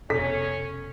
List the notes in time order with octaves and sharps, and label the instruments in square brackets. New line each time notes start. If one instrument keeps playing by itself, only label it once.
[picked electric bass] F1 B2 [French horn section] C#4 C#5 [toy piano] A4 [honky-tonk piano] B6